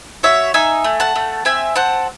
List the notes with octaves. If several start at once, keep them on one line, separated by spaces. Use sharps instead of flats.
F#4 C#5 E5
D#4 E5 G#5
A3
F#5 A5
A3
C4 E5 G#5
C4 F#5 A5